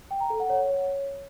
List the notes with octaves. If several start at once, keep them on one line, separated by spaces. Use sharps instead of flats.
G5
A#5
A4
F#5
C#5